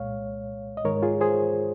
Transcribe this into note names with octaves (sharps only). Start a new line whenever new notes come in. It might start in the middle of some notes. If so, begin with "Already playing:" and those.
Already playing: C2 A#2 G#3 C#5 F5
D#5
G#2 D#3 G#3 A#4 C#5
F4 G#4
G#4 C5